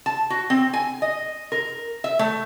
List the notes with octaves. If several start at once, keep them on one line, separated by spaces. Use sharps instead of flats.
A5
F#4
C4
G#5
D#5
A#4
E5
A3